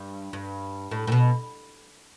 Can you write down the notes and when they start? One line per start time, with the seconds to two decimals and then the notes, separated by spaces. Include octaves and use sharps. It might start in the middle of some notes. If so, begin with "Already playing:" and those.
Already playing: G2
0.33 G2
0.91 A2
1.07 A2
1.12 B2